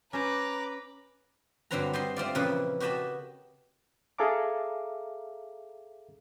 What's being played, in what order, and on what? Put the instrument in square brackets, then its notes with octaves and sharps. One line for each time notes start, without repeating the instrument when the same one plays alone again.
[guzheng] C#4 C5 [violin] B4 [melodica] A#5 [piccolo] D6
[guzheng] G2 D3 F#3 C4 B4 A#5
G3 C5 D#5 C6
A3 C4 F4 D5
F2 A#2 C#3 E3 B4
F#4 G4 B4 D#5 A5 B5
[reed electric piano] G#4 A4 E5 F5 A#5 D6